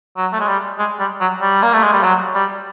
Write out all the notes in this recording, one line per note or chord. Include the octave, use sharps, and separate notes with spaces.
F#3
A3
G#3
G3
G#3
G3
F#3
G3
A#3
A3
G#3
G3
F#3
G3